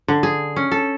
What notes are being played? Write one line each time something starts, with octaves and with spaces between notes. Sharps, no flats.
D3
G#4
C#4
A4